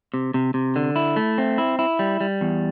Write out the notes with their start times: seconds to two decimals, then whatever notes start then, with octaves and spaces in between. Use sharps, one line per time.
0.14 C3
0.34 C3
0.54 C3
0.76 D3
0.96 E4
1.16 A3
1.38 C4
1.58 E4
1.79 E4
1.99 G3
2.21 G3
2.41 E2